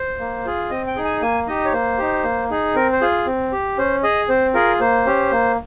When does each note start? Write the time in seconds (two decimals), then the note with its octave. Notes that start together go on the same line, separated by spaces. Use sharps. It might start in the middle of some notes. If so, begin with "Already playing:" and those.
Already playing: C5
0.20 A#3
0.45 F4 G#4
0.70 C4 D#5
0.87 G5
0.96 D#4 G#4
1.05 G#5
1.22 A#3 G#5
1.47 D#4 G4 D#5
1.65 C#5
1.72 A#3 C5
1.98 D#4 G4
2.24 A#3
2.50 D#4 G#4
2.75 C4 A#4
2.92 C5
3.01 F4 G#4
3.26 C4
3.52 G4
3.77 C#4 C5
4.03 G#4 D#5
4.29 C4 C5
4.54 F4 G#4 A#4
4.80 A#3 C5
5.06 C#4 G4
5.31 A#3